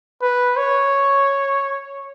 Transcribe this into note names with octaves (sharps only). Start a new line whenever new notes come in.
B4
C#5